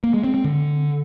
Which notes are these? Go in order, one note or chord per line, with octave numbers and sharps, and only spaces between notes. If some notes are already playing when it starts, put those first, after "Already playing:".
A#3
G#3
C4
C4
D3